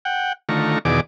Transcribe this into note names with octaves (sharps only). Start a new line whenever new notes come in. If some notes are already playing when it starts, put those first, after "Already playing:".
F#5 G5
D3 D#3 A3 F4 A#5 C#6
E2 B2 D#3 G#4 D5 D6